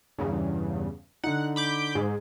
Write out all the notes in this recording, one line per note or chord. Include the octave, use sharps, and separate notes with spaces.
E2 G2 C#3
D3 D#4 F#5
B5 D6 G6
G#2 G#4